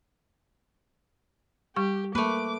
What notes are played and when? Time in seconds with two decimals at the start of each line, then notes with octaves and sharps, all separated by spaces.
1.76 G3 G4 C#6
2.15 A3 A#3 B4 D6